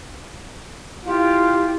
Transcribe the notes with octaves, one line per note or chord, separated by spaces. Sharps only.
E4 F4 G4